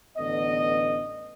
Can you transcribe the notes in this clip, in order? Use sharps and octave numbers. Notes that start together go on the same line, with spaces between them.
A1 D3 B3 D#5